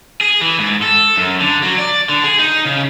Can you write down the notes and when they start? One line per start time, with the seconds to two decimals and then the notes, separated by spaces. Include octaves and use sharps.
0.21 G#4
0.41 E3
0.59 G#2
0.82 A4
1.17 F#2
1.41 D3
1.63 F#3
1.78 D5
2.09 D3
2.24 G#4
2.39 D#4
2.65 C#3